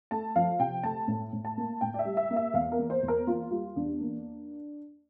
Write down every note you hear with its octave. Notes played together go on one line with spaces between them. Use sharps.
A3 A5
F3 F5
C3 G5
A3 A5
A2
A2
A5
A#3
A2 G5
D5
E5
G3
E5
A#3
E5
E2 F5
A#4
A#3
C5
E2
A#4
A#3 F4
G3 F4
E2 D4
A#3